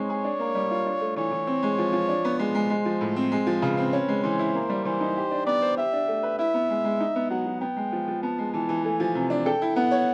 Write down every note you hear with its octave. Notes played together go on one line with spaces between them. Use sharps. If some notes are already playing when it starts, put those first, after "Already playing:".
Already playing: G#3 C4 D#4 C#5
G#4
D4
A#3
G3
F4
D4
A3
E3 C#5
E3
C4
G#3
F3
F3
D4
B3
G#3 C5
G#3
G#3
F3
A2
C4
G#3
F3
C#3 B4
C4
C#4
G#3
E3 C5
E4
A#3
G3
E3 C5
D#4
G4
D4
B3 D5
C5
G4 E5
D4
A3
B4
E4 E5
B3
G#3
G#3
D#4
B3
F#3 F#5
F#3
B3 G5
G#3
F3
F3
B3 A5
G#3
E3 A5
E3
A3 G#5
F3
C3
D4
A4 G5
E4
B3 F#5
C#5